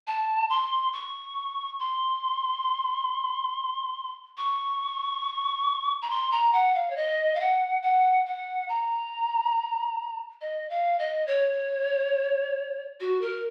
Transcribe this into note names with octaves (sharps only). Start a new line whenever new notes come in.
A5
C6
C#6
C6
C#6
A#5
C6
A#5
F#5
F5
C#5
D#5
F5
F#5
F#5
F#5
A#5
D#5
F5
D#5
C#5
F#4
A#4